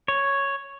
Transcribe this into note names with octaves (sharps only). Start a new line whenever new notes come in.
C#5